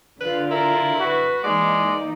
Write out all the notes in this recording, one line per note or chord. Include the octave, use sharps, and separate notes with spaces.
D3 F4 B4
E4 A#4
F#4 B4
E3 G#3 A#3 D#4 D5